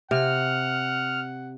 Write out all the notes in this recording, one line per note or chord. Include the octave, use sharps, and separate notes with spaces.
C3 F#5 F6